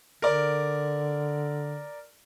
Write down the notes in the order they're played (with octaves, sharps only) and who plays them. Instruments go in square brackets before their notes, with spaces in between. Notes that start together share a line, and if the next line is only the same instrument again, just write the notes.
[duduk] D3 [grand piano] A#4 D5